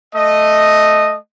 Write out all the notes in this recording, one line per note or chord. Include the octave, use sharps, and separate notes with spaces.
A3 D#5